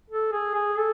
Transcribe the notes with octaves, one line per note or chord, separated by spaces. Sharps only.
A4
G#4
G#4
A4